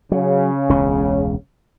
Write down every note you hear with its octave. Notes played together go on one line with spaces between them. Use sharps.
C#3 F#3
E1 C#2 C#4